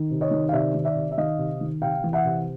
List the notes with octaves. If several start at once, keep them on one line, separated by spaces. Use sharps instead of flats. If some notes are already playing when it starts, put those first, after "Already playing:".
Already playing: D#3
C3
C#5 D#5
D#3
F5
C3 D5 E5
D#3
D5 E5
C3
E5
D#3 D#5 F5
C3
D#3
C3 F5 G5
E3
E5 F#5
C3